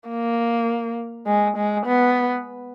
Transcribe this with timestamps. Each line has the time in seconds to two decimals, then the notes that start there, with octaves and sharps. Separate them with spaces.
0.09 A#3
1.27 G#3
1.57 G#3
1.86 B3